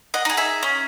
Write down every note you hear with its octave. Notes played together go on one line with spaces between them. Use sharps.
D#5 F#5
D#4 G#4
E5 G#5
C#4